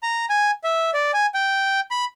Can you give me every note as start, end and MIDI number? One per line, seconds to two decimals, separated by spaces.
0.03 0.25 82
0.30 0.51 80
0.64 0.91 76
0.94 1.11 74
1.14 1.26 80
1.34 1.80 79
1.91 2.05 83